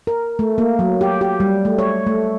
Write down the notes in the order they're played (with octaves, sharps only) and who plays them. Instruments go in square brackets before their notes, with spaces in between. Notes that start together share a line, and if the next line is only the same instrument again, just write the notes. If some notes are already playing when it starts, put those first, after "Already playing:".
[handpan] A#4
A3
A#3
F#3
G4
G4
G3
A3
C#5
A3